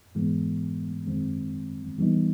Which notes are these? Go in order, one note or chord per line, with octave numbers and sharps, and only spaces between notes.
G#2 E3 G#3 B3
F#2 D#3 G#3 C4
E3 G3 B3 D#4